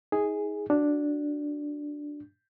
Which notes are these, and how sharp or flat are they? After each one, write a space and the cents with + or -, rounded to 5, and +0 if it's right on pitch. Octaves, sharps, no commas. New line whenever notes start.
D#4 +35 G#4 +0
D4 +0 F#4 +0